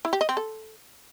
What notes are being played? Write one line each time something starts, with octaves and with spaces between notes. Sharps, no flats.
E4
G4
D#5
C4
A4